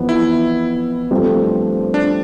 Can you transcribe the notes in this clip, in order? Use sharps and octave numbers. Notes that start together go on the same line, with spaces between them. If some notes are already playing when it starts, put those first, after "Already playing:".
Already playing: F2 E3 B3
E4
G2 F3 A3 C4
D4